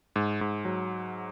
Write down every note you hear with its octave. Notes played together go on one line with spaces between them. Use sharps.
G#2
G#2
F#3